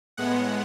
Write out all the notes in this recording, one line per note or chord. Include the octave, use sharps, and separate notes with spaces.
A2 G#3 B3 F#5